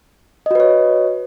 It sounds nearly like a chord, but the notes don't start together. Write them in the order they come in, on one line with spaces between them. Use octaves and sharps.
D#5 F#4 B4 C#5